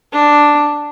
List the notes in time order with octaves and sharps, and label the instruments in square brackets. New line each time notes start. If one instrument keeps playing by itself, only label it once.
[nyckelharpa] D4